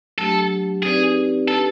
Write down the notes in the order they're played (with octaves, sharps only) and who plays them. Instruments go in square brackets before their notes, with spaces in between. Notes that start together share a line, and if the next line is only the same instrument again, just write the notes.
[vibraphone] F#3 A3 D4 G4 [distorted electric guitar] A4
[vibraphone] C4 D#4 G4 B4 D5 [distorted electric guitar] G#4
[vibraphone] D4 G4 B4 [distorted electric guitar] A4